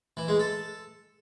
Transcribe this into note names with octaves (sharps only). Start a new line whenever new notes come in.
E3
G#3
A4